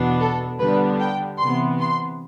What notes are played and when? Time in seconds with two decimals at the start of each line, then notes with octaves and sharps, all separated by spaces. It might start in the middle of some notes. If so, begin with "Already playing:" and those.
Already playing: E2 B2 B3 D4
0.20 A4
0.59 D3 G3 B3 D4 B4
0.99 G5
1.39 C3 E3 B3 C6
1.79 C6